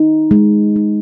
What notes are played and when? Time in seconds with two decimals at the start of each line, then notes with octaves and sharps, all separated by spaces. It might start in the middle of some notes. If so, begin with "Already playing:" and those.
Already playing: D#4
0.31 G#3
0.76 D#4